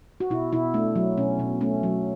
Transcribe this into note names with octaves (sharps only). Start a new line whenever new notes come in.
F#4
B2 E4
B2 E4
A3 D4
F#3
B2 C#4
B2
A3 C#4
F#3